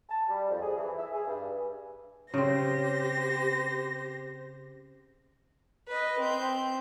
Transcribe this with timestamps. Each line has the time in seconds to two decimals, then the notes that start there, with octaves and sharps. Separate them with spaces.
0.09 A5
0.29 G3
0.49 F2
0.62 G#4
0.76 E3
0.98 E5
1.12 G#4
1.27 G2
2.34 C#3 C4 G4 C5 A#6
5.88 B4 D#5
6.19 C4 G6